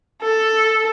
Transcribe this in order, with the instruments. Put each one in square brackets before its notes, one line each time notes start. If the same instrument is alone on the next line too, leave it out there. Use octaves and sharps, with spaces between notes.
[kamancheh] A4